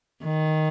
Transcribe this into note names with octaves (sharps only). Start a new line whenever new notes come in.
D#3